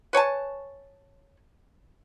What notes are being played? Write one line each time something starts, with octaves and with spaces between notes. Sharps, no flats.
B4 C#5 G#5 A5